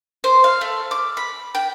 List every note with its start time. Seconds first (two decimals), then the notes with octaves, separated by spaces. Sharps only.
0.24 C5
0.44 F5
0.61 A3
0.91 D6
1.17 B5
1.55 G5